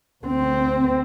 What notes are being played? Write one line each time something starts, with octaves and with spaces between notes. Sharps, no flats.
D2 C4